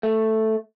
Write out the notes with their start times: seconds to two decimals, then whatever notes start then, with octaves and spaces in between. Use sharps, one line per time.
0.03 A3